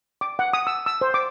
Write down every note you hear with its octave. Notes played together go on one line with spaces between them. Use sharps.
D6
F#5
D#6
E6
E6
C5
D6